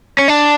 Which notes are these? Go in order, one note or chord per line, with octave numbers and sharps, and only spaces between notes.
C#4
D4